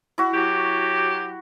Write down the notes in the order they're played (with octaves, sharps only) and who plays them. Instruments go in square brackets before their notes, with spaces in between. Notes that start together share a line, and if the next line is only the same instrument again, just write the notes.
[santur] E4 F#4
[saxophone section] F#3 G4